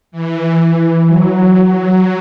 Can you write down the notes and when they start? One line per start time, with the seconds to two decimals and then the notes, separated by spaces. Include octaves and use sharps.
0.12 E3
1.07 F#3